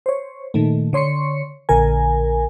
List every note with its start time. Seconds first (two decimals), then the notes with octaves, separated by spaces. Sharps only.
0.06 C5 C#5
0.54 A#2 D#3 A3
0.93 D3 C#5 C6 C#6 C#7
1.69 A#1 D3 A#4 G#5